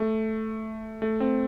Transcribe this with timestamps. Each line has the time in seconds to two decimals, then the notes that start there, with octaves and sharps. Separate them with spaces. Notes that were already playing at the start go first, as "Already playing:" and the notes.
Already playing: A3
1.02 A3
1.20 C4